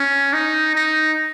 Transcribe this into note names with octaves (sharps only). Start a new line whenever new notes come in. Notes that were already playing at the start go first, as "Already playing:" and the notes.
Already playing: C#4
D#4
D#4